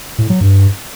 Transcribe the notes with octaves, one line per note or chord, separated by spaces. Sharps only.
A2
F#3
G2